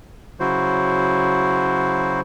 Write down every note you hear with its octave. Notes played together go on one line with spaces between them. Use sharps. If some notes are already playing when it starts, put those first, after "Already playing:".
C#3 F#3 E4 F#4 C5